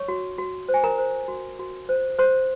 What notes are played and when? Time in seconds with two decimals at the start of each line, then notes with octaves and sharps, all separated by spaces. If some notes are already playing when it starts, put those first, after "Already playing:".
Already playing: C#5 C#6
0.08 F#4
0.38 F#4
0.69 C5
0.74 G#5
0.84 A#4 A#5
0.98 C5
1.28 F#4
1.59 F#4
1.89 C5
2.19 C5 C6